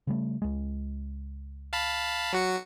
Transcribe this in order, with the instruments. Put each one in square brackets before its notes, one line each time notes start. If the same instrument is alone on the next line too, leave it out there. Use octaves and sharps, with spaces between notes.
[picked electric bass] C#3 G3 A3
C#2 G#3
[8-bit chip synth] F5 A5 B5
F#3 F#4 C#7